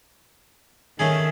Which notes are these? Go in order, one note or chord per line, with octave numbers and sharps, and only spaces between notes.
D#3 A3 C#4 G#4